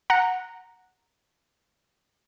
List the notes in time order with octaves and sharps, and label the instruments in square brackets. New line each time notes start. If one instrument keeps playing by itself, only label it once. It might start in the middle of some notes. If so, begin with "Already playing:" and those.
[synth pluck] F#5 A#5